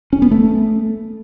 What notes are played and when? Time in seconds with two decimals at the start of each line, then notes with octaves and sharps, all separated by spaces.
0.13 C#4
0.22 B3
0.31 A3